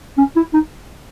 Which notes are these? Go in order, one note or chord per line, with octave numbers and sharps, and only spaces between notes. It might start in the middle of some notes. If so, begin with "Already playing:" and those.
C#4
E4
D#4